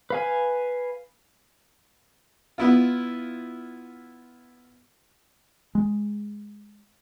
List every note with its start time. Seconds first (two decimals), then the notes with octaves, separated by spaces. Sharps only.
0.10 B4 F5 G#5
2.58 B3 E4 F4
5.75 G#3